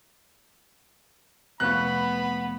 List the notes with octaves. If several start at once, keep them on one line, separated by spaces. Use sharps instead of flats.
F1 B3 F5 B5 C#6 F#6